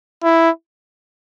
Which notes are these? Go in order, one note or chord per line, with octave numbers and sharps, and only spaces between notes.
E4